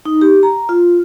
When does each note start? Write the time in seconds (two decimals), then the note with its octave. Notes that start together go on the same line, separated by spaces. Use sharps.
0.05 D#4
0.21 G4
0.43 A#5
0.69 F4